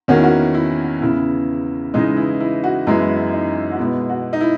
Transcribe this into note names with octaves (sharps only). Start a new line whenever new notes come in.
E2 D#3 A#3 C#4 F#4
E4
F#4
E4
E2 C#3 E3 E4
C#3 E3 G#3 D#4
E4
E4
F#4
F#2 E3 G#3 B3 E4
D#4
F#4
B2 G#3 B3 E4
F#4
D#4
E4